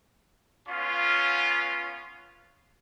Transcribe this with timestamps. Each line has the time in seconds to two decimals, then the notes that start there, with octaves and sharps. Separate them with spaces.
0.68 B3 C#4 F4